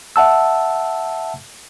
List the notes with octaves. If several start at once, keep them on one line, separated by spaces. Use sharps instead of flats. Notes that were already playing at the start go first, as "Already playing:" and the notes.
E5 F#5 A5 E6